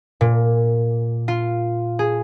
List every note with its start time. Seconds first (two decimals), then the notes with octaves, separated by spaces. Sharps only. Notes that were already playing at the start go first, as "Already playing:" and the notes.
0.21 A#2
1.28 F4
1.99 G#4